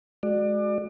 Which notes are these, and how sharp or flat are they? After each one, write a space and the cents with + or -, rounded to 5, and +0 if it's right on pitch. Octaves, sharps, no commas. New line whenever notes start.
G#3 +25 F#4 +0 D5 +30